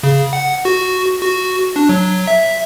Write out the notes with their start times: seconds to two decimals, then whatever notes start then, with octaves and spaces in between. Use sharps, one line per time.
0.03 C#3
0.33 F#5
0.65 F#4
1.21 F#4
1.76 D4
1.89 F#3
2.27 E5